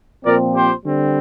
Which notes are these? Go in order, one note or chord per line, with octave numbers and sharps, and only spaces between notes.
A#2 F3 C4 A#4 D5
G4 C5
D3 G3 C4